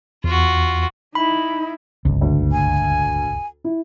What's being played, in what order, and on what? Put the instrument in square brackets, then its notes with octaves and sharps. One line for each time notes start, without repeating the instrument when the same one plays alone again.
[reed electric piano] E2 [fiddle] F4 F#4
[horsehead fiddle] D#4 E4 [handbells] B5
[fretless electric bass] D1 G1 C#2
[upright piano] D2
[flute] G#5
[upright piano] E4